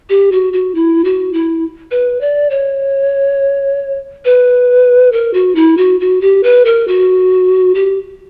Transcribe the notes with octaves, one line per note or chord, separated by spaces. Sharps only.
G4
F#4
F#4
E4
F#4
E4
B4
D5
C#5
B4
A#4
F#4
E4
F#4
F#4
G4
B4
A#4
F#4
G4